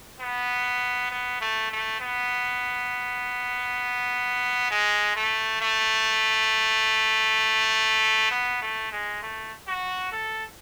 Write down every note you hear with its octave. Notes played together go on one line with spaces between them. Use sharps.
B3
B3
A3
A3
B3
G#3
A3
A3
B3
A3
G#3
A3
F#4
A4